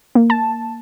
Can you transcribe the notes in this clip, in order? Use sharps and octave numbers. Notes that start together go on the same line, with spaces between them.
A#3
A5